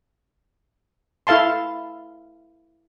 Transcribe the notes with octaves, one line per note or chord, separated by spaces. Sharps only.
E4 A4 F5 A5 C6